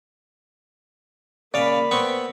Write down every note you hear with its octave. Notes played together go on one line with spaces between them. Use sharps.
C#3 A#3 D5 F5 B5
B3 C4 C#6